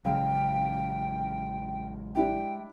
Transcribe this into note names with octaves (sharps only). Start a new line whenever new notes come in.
A1 C#3 F#3 G#3 F5 G5
D4 E4 G4 G5